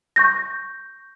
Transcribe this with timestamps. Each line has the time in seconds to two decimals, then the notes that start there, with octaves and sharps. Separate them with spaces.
0.16 C#6 G6 A#6